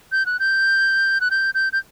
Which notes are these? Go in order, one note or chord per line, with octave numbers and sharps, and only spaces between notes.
G6
F#6
G6
F#6
G6
G6
G6